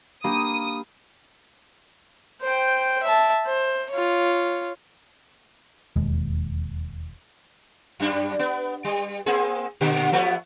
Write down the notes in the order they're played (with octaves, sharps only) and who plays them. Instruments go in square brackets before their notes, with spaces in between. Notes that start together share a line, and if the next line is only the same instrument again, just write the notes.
[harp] A#3 G4 [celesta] D4 F5 B5 [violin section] D#6
[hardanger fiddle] C5 G5
E5 A5
C5
F4 C#5
[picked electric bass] E1 D#2 G#3
[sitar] F#2 G3 D4
B3
G3
A#3 C4 G#4
A#2 D3 G4
F3 A3 B3